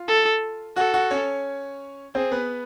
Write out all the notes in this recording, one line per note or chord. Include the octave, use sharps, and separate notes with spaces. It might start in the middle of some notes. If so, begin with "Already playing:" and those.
Already playing: F4 F5
A4
F#4 A4 F#5
F#4 F#5
C#4 C#5
C4 G#4 C5
B3 B4